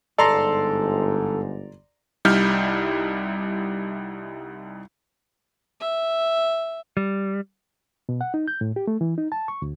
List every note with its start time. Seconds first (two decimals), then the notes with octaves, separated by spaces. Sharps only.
0.18 G1 G#2 A4 D5 A#5 C6
2.25 C2 G3 D#4 E4 F6 G6
5.81 E5
6.97 G3
8.09 B2
8.21 F#5
8.34 D#4
8.48 G6
8.61 A2
8.76 G4
8.87 A3
9.01 E3
9.18 D#4
9.32 A5
9.48 C#6
9.62 D2